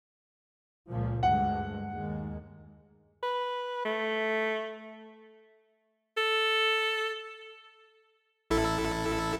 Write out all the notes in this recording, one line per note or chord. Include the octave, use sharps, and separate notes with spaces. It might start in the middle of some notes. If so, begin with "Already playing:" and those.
C#2 A#2 F3
D2 G2 G#3 F#5
D#2 G#3
B4
A3
A4
A1 E4 A4